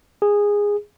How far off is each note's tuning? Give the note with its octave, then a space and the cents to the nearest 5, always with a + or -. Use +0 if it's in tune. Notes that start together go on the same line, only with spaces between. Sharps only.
G#4 -15